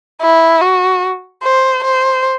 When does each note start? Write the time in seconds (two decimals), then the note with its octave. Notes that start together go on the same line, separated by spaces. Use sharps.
0.22 E4
0.61 F#4
1.43 C5
1.84 C5